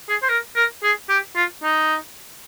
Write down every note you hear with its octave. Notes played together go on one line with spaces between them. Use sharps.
G#4
C5
A#4
A#4
G#4
G4
F4
D#4